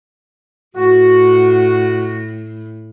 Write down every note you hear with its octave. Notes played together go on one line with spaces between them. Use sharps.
A2 F#4